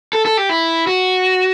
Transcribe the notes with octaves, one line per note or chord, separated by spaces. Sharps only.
A4
A4
G4
E4
F#4